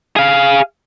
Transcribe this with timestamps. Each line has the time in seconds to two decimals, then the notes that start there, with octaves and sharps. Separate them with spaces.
0.16 G#4 F5